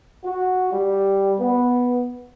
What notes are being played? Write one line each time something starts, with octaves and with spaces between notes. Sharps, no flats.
F#4
G3
B3